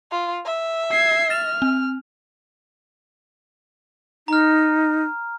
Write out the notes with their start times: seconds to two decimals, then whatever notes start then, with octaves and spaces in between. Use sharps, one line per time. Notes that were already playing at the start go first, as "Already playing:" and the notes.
0.11 F4
0.45 E5
0.91 G#6 C7
1.30 F6 A6 E7
1.62 C4
4.28 D#4 A#5 F6